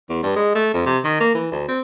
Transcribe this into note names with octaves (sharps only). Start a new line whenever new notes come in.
E2
G2
G#3
A3
F2
C3
D#3
A#3
E3
D2
C4